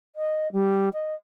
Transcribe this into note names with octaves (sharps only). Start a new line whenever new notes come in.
D#5
G3
D#5